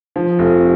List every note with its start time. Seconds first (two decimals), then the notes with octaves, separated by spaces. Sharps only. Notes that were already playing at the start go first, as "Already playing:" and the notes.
0.16 F3
0.39 F1